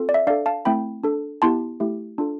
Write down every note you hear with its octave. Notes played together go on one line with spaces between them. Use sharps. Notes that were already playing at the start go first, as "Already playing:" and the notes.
Already playing: C4 F4 A4
D5
E5
D4 A4 D5 F5
F5 A5
A3 C4 E4 G5 B5
D4 A4
B3 E4 G4 A5 C6
A3 E4 G4
D4 F4 A4